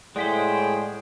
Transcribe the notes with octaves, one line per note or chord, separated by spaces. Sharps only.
A2 G#3 G#4 C5 D5 F#5 G5 B6